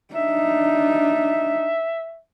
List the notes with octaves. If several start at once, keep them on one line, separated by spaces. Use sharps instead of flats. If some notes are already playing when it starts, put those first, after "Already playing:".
D4 D#4 E5